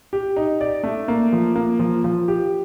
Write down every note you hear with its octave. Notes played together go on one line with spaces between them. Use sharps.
G4
D#4
D5
A3
A#3
F3
A#3
F3
F3
G4